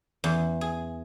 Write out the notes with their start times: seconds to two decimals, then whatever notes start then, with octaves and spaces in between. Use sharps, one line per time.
0.24 E2
0.61 G#4